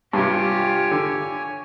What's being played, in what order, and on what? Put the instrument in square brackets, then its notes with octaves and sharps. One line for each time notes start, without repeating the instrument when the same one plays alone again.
[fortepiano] G2 C3 [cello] F4 G4 [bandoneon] C#5 G#5
[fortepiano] D3